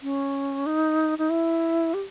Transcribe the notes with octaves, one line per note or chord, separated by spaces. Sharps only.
C#4
D#4
D#4
E4
G4